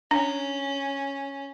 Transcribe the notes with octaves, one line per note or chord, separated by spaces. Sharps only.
C#4 D4